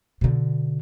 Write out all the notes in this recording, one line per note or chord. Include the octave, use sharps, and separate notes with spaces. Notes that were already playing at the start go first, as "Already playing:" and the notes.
B2 D3